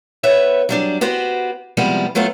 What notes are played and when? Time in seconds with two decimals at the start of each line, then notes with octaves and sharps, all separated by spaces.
0.23 B3 B4 C#5 E5
0.69 F#3 G3 D4
1.01 B3 F#4 G4 C5
1.77 C3 F3 G3 G#3 B3
2.15 F#3 A3 B3 F4 C5